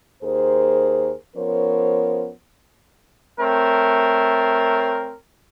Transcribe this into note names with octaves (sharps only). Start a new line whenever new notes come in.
D#2 G#4 A#4 C5
F3 B3 C#4 A#4 C5 C#5
A3 C4 A#4 C#5